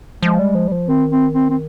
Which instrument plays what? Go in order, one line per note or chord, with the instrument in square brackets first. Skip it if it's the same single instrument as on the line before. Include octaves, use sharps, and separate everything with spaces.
[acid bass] F3 [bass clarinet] G#3
[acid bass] G3
F3
G3
F3
[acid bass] D#3 [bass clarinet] C4
[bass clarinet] C4
C4
C4